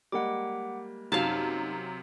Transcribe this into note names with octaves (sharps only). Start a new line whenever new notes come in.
G3 G#3 A#3 F#5 D6
F#2 C3 D#4 F5 A5